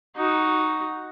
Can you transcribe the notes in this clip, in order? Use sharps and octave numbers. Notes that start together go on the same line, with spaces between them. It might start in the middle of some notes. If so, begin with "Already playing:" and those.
D#4 F#4